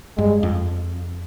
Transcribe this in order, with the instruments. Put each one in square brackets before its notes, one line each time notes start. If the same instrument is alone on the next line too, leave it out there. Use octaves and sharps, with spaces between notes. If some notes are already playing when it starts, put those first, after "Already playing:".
[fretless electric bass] G2 [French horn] G#3
[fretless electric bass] F2